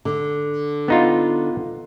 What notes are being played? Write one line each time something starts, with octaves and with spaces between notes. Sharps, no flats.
D3
B3 D#4 F4